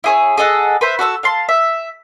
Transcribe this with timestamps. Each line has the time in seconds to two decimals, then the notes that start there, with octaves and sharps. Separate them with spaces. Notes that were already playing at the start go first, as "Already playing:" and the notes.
0.04 E4 G#4 C#5
0.38 G#4 A4 D#5 F#5
0.81 B4 C5 E5
0.99 F#4 A4 C6 E6
1.23 F5 A5 C6
1.49 E5